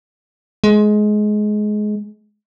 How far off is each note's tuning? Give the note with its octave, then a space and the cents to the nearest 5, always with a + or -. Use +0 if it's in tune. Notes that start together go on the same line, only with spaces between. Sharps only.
G#3 +20